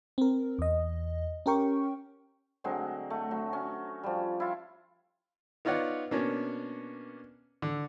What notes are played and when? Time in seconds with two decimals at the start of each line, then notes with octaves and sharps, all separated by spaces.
0.18 C4 A#4
0.59 E2 D#5
1.46 C#4 G4 A#4 G5 C#6
2.64 D3 F#3 G#3 C4
3.10 A3
3.31 F#3
3.53 C#4
4.03 F3 G3
4.40 E4 F4
5.65 B3 D#4 F4 C#5 D5 F#5
6.11 B2 A#3 B3 C#4 D4 C#5
7.62 D3